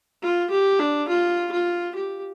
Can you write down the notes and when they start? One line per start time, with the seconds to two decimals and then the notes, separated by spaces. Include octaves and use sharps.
0.22 F4
0.51 G4
0.79 D4
1.08 F4
1.52 F4
1.95 G4